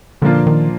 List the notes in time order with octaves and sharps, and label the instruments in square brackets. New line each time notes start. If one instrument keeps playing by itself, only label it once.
[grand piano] A#2 F3 A#3 D4 F4 [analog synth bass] D3
[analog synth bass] D#3